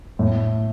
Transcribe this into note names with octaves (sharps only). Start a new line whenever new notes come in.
A2